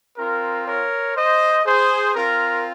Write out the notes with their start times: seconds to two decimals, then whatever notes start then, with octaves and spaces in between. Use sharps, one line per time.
0.17 C4 F4 A#4
0.66 A#4 C#5
1.16 C5 D#5
1.65 G#4 C5
2.15 C4 F4 A#4